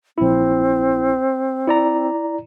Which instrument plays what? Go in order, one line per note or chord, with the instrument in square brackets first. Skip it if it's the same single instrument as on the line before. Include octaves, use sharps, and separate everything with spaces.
[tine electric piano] A#1 E4 [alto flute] C4
[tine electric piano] E4 D5 A#5